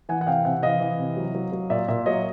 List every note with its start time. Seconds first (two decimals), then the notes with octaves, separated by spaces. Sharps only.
0.09 E3 F#5 G#5
0.21 F#5
0.27 C3 F5 G5
0.45 C3 E5 F#5
0.63 E3 D#5 F5
0.80 E3
1.00 C3
1.17 F#3
1.35 F#3
1.52 F#3
1.70 A#2 D5 E5
1.88 A#2 D5 E5
2.06 F#3 C#5 D#5